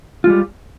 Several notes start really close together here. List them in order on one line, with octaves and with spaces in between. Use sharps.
F4 G#3 G3